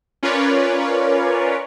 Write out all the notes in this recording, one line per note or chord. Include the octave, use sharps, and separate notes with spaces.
C#4 F4 A#4 B4 C#5 D5